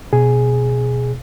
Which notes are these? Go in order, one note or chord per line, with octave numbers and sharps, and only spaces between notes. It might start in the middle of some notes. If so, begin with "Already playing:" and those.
B2 G#4